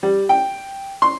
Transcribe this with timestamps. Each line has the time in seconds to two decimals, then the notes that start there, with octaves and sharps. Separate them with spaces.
0.03 G3
0.29 G5
1.02 C6